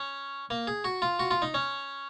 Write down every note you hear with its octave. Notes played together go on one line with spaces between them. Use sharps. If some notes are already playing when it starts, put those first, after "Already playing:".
Already playing: C#4
A#3
G#4
F#4
F4
F#4
F4
D#4
C#4